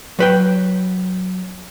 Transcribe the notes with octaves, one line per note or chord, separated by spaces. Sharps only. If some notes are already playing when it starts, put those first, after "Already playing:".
F#3 B4 G5